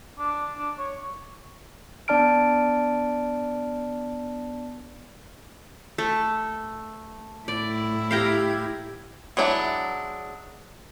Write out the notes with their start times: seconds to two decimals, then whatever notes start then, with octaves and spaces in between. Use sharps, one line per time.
0.18 D4
0.58 D4
0.79 C#5
2.08 B3 D4 D5 A5 F6 D7
5.98 A3
7.48 A2 E4 D5
8.11 G4 F5 G5 A#5 G#6
9.37 F#3 G#3 D4 E4